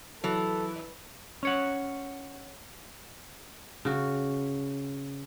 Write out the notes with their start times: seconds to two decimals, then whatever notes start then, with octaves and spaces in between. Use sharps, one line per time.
0.24 E3 F#3 A4
1.43 C#4 C#5 F#5
3.85 C#3 F#4